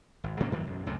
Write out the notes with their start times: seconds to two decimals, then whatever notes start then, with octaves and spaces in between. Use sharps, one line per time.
0.24 G#1
0.40 G#2 C3 A#3 C#4
0.52 F#2 D#3 E3 F#3
0.67 B1 F#2
0.86 C#2 F#2 C3 A3